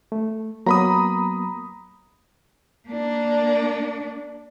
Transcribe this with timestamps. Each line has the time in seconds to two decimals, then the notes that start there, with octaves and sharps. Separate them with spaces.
0.12 A3
0.66 F#3 A#3 B3 A#5 B5 D#6
2.89 A#3 D4